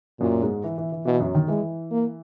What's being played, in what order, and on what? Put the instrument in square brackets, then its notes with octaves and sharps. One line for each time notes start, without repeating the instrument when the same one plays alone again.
[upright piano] F#2 F#3 [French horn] A#2
[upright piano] G#2 G#3
E3
E3
E3
[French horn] B2 [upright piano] E3
[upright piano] F#2 F#3
D#3
[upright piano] E3 [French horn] G#3
[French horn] A#3